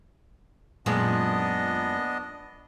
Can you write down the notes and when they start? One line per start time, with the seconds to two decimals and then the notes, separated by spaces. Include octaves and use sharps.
0.86 F#2 A#2 G#3 B3 D4 D#5